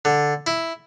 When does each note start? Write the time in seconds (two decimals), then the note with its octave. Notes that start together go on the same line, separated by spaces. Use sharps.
0.05 D3
0.47 E4